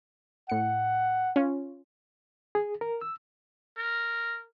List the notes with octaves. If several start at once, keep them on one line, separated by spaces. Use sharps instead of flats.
A2 F#5 C#7
C#4 F4
G#4
A#4
E6
A#4